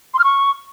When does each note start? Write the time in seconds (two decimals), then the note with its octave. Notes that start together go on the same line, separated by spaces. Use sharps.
0.14 C6
0.19 F6
0.24 C#6